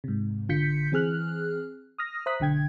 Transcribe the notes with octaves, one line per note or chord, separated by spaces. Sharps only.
G#2 C3
A1 D3 F4 G6 B6 C#7
E3 C4 G#4 F6 F#6
D#6 F6 A#6
C5 E5 A#5 D#6 F#6 B6
B1 D3 G5 G#6